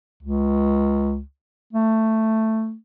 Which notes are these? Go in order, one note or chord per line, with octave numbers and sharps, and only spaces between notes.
C#2
A3